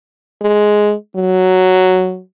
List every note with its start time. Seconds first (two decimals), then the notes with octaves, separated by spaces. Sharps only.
0.42 G#3
1.16 F#3